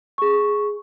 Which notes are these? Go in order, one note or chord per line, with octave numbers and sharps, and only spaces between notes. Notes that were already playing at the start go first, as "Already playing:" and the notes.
G#4 C#6